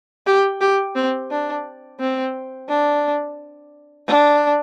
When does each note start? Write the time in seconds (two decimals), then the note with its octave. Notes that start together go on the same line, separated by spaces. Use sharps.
0.27 G4
0.61 G4
0.95 C4
1.31 D4
2.00 C4
2.69 D4
4.08 D4